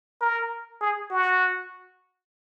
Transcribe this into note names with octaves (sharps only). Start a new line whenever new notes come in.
A#4
G#4
F#4